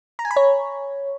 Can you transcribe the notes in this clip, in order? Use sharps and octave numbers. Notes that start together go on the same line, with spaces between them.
A#5
G#5
B5
C#5